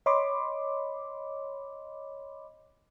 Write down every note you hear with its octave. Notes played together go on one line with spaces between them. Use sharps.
C#5 D#5 B5 C6 D6